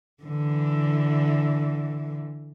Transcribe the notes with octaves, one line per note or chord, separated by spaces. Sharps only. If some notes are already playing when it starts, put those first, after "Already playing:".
D3 E3